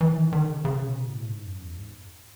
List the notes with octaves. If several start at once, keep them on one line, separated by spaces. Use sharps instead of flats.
E3
D#3
D#3
C#3
C#3
B2
A2
G#2
F#2
E2
G#2